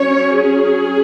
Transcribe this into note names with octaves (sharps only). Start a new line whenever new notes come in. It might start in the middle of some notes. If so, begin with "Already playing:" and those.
Already playing: F#3 C#4 C#5
G#4